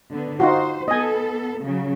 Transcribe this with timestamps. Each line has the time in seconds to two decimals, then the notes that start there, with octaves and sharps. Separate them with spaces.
0.11 D3 B3
0.40 D#4 F4 F#4 C5
0.88 B3 A4 D#5 G#5
1.63 C#3 F#3